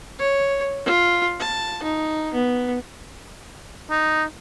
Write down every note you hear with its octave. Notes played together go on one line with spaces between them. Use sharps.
C#5
F4
A5
D#4
B3
D#4